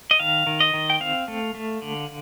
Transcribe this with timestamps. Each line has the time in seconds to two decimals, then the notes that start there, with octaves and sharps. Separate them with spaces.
0.11 D#5
0.20 D#3 F5
0.47 D#3
0.60 D#5
0.74 D#3
0.90 G5
1.00 C4 F5
1.28 A3
1.55 A3
1.82 D3